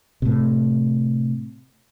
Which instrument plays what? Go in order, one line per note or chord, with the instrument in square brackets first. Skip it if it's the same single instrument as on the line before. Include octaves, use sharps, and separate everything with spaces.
[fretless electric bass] A2 C3